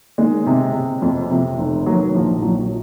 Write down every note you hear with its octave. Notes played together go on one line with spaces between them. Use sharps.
D#3 G#3
C3
C3
F2
C3
F1
D#3 F#3
A#1 F3
A#1 F#3